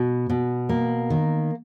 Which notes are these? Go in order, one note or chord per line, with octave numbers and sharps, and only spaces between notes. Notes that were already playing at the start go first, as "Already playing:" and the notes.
Already playing: B2
B2
A#3
D#3